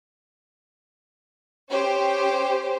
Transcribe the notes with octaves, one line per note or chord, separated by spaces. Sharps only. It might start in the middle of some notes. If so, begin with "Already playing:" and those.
C#4 G4 C5